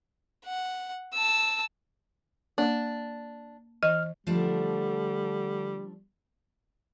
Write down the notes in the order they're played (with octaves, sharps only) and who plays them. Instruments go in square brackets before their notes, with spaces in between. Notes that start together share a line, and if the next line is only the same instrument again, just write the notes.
[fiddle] F#5
A5 E6
[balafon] A#3 [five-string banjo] D4
[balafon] E3 [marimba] D#5 [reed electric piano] F6
[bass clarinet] D3 [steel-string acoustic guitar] F3 A3 D4 [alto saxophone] G3